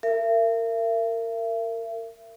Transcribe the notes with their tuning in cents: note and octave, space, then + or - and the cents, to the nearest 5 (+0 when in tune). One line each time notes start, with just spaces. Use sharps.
A#4 -25 E5 +40